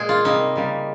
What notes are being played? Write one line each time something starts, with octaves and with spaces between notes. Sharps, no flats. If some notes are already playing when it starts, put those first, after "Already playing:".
Already playing: A#2 G#3 G#4
F4
C3 G3 A#3 D#4
C#3 G3 A#3